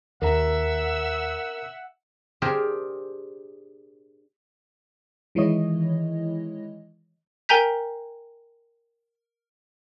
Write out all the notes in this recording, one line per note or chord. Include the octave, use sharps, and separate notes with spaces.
D#2 A#4 E5 F#5 A#5 E6
D4 G4 G#4 A#4 C5
D#3 E3 G#3 E4 C#5 D#5
A#4 G5 G#5 A#5 G6 B6